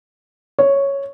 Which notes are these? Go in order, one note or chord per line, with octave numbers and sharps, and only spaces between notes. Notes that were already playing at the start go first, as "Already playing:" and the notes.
C#5